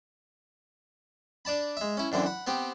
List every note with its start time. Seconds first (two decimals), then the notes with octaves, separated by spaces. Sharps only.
1.45 D4 D5 A5 B5
1.77 G#3 E5
1.97 C#4 E4
2.12 F#2 D3 E3 C4
2.26 F#5 B5
2.47 B3 C4 G4